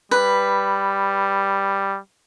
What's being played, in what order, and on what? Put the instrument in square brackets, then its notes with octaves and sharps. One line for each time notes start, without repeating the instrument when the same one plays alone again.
[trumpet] G3 [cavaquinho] B4